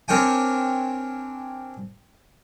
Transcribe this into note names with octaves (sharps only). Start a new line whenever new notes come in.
C4 D4 A#4 C#5 G5 G#5